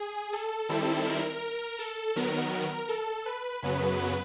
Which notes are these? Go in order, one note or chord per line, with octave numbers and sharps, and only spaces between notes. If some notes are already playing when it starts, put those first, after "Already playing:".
Already playing: G#4
A4
D#3 G3 C4 E4
A#4
A4
D#3 F#3 B3 A#4
A4
B4
F#2 C#3 F#3 B3 B4